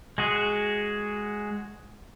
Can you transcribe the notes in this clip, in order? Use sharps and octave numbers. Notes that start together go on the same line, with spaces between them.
G#3 F#4 G#4